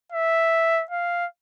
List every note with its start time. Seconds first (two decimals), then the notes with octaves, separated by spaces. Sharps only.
0.12 E5
0.91 F5